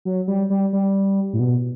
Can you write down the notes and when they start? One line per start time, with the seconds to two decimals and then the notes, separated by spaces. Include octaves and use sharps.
0.05 F#3
0.28 G3
0.50 G3
0.73 G3
1.33 A2
1.40 B2